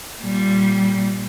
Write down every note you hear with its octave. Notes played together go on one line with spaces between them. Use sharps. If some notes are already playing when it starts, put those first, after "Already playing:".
A#2 G3